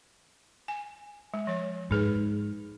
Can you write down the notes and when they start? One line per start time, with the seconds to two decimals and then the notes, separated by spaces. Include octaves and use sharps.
0.68 G#5
1.34 G#3
1.47 F3 C#5
1.91 G#2 D#4 G#4 B4